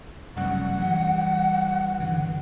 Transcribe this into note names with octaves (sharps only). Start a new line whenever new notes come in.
F1 F#2 G3 F#5
E3 G3
G2 D3 E3